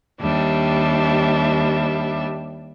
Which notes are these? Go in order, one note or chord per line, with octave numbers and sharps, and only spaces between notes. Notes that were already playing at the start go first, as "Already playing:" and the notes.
D#2 G3 D4 E5